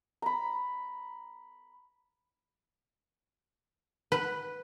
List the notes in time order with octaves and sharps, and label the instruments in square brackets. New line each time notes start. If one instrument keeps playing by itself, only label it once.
[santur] A#5 B5
[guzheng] B4